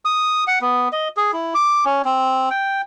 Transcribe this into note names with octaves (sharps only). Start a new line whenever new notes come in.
D#6
F#5
B3
D#5
G#4
E4
D6
C#4
C4
G5